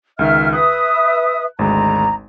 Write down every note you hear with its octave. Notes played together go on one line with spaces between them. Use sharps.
C#2 D#3 E5 F6
B4 E5 D#6 F#6
G#1 D2 G#3 A#5